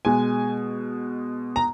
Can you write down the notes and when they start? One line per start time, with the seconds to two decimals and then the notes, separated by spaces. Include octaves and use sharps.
0.05 B2 G#3 G#5
1.56 A#5